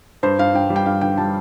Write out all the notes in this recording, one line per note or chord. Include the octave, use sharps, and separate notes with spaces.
G2 C5
G2 F5
G2 G5
G3
G5
G2 F5
D3 G5
G3 A5